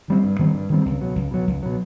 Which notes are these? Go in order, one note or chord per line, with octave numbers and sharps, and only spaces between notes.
D#3 G3 C4
G2
D#3 G3 C4
G2
D#3 G3 C4
C#2
B2 F#3
C#2
B2 F#3
C#2
B2 F#3